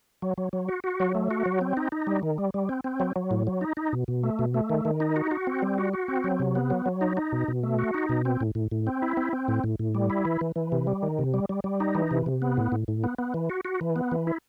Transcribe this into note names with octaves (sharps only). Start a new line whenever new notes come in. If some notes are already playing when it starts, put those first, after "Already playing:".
F#3
F#3
F#3
F#4
F#4
F#3
A3
F#4
F#3
C4
D#4
D#4
G3
D#3
G3
G3
C4
C4
F#3
F#3
A2
F#3
D#4
D#4
B2
B2
A3
B2
A3
D#3
D#3
D#4
F#4
F#4
C4
G3
F#4
F#4
C4
F#3
C3
B3
F#3
F#3
D#4
D#4
B2
B2
A3
F#4
D#4
B2
C4
A2
A2
A2
C4
E4
C4
C4
A2
A2
A2
G3
E4
E3
E3
E3
C3
G3
D#3
C3
G3
G3
G3
D#4
E3
C3
C3
B3
A2
A2
A2
B3
B3
E3
F#4
F#4
E3
B3
E3
E4